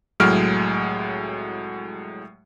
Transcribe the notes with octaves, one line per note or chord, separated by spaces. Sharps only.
C2 A2 F#3 G#3 F6 D7